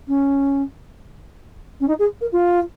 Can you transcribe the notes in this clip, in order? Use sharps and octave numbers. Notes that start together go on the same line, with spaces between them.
C#4
C#4
D#4
G#4
A#4
F4